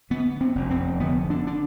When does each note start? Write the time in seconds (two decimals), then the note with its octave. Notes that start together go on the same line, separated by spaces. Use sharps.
0.10 D3 B3
0.41 C4
0.55 F1
0.71 C4
1.00 D3 B3
1.30 D4
1.47 D4